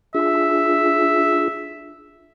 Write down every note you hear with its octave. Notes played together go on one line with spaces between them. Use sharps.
D4 F4 G#4 E5